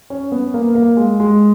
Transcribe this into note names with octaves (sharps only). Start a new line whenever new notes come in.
C#4
B3
A#3
A#3
G#3
G#3